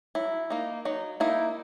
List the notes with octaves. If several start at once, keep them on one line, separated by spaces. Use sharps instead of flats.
F#3 E4
A#3 D#4
F#3 D#4
A#3 D#4 E4